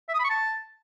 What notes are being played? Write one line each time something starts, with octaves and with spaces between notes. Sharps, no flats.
E5
D#6
B5
C#6
A5